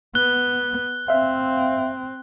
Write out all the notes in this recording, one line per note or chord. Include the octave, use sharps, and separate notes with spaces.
B3 F#6 G7
C4 E5 F5